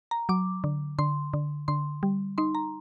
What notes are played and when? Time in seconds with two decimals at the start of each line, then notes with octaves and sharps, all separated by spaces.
0.11 A#5
0.29 F#3 D6
0.64 D3
0.99 D3 C6
1.34 D3
1.68 D3 C6
2.03 G3
2.38 D#4 C6
2.55 A#5